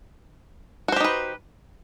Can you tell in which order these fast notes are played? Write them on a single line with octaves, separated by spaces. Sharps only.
F#4 C5 G4 D#4 B4